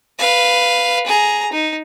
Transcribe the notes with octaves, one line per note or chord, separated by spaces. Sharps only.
B4 F5
G#4 A#5
D#4